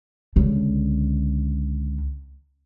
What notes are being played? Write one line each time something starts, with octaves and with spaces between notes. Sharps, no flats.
C#2 D3